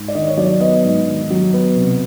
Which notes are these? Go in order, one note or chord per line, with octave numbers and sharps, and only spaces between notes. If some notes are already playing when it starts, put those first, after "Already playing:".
Already playing: G#2
D5
D#3 D#5
C#5
F#3 D5
B3 D#5
G#2
D#3
F#3
B3
C3